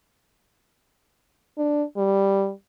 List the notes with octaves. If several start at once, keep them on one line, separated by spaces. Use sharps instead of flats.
D4
G3